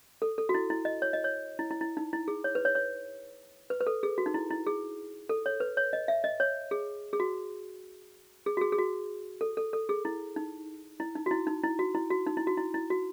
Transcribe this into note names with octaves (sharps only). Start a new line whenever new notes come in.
A4
A4
F#4
E4
E4
D#5
C#5
D#5
C#5
E4
E4
E4
D#4
E4
G#4
C#5
B4
C#5
C#5
B4
B4
A4
G#4
F#4
D#4
E4
E4
G#4
A4
C#5
B4
C#5
D#5
E5
D#5
C#5
G#4
G#4
F#4
G#4
F#4
G#4
G#4
F#4
A4
A4
A4
G#4
E4
D#4
E4
D#4
F#4
E4
D#4
E4
F#4
E4
F#4
D#4
E4
F#4
E4
E4
F#4